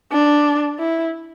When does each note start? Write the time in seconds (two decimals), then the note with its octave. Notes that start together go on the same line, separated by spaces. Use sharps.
0.12 D4
0.79 E4